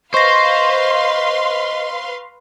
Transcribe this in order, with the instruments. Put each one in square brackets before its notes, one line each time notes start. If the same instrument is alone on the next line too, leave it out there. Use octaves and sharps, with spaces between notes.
[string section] B4 F5 C6 [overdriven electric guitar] C5 [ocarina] D#5 [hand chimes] C#6 A#6